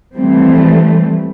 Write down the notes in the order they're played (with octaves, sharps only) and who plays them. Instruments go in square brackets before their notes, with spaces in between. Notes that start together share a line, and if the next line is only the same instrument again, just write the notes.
[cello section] E3 F3 G3 A3 C4